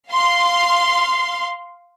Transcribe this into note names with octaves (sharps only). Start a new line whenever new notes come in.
F5 C6